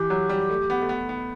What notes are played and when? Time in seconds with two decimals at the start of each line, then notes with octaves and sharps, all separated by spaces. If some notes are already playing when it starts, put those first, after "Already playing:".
Already playing: E3 G4
0.10 F#3
0.29 G3
0.50 A3
0.70 B3
0.82 A3
0.89 B3
1.09 B3